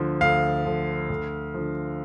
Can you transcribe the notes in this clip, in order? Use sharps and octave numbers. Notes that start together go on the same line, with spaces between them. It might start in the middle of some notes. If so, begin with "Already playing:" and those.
Already playing: D2 D3 F3
D2 F5
D3 F3
D2
D3 F3